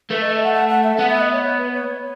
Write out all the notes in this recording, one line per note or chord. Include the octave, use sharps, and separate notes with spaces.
A3 B4
D#5
E5
F#5
F#5
F#5
E5
B3 F#5
E5
D#5
C#5
C#5
B4
C#5
C#5